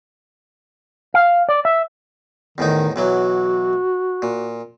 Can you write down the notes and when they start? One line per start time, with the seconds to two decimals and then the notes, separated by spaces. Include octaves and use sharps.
1.14 F5
1.49 D5
1.65 E5
2.58 E2 A2 D#3 D#4
2.96 B1 E3 F#3 F#4
4.22 A#2